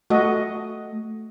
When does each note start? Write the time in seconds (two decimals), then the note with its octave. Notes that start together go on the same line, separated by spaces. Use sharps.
0.10 A3 F#4 D#5